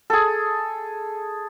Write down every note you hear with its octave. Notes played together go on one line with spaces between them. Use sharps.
G#4 A4